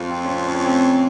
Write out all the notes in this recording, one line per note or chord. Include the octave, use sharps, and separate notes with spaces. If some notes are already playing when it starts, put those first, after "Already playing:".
Already playing: F2 F4
C4
C#4
C4
C#4
C#4
C4